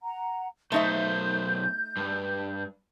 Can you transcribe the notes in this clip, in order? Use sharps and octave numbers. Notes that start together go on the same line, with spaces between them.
F#5 A#5
B1 A3 D#4 C5 E5 G6
G2